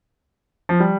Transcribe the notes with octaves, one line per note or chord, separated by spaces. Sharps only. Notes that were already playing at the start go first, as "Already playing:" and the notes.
F3
G3